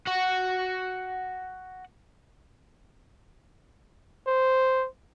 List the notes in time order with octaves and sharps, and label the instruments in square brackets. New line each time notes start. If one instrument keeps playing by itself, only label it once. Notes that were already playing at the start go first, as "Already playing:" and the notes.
[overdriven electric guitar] F#4 F#5
[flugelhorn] C5